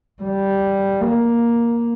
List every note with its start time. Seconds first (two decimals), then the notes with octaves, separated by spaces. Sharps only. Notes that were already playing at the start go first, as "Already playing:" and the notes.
0.23 G3
1.01 A#3